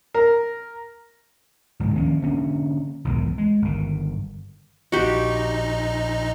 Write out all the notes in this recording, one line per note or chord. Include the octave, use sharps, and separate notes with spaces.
A#4
D2 G#2 C3 E3
D#3 F3 A#3 C#4
D3 A#3 C4 C#4
B1 E2 G#2 D#3
G#3
G1 D#3
A#1 D#4 F#4 G4